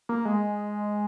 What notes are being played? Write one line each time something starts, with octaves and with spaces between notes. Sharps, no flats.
A#3
G#3